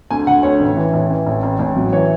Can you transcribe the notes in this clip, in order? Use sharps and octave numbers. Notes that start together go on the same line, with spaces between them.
D2 G#5
D2 F#5
D2 C#5
A1
E3
A1
E3
A1
A1
A1
F#3
E3 C#5